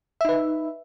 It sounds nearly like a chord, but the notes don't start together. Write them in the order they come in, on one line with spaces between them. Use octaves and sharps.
E5 D#4 B4